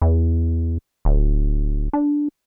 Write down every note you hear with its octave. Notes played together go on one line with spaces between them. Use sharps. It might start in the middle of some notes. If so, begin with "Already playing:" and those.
E2
D1
D4